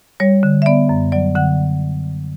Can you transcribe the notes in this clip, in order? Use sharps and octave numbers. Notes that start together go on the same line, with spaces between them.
G3 C#5
D3
E5
B3 D5
F#2
F#3 D5
D3 F#5